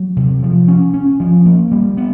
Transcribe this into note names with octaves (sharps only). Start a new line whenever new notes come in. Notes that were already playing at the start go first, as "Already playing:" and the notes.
Already playing: F#3
C3
F3
C#4
C#4
F3
A#3
G3
B3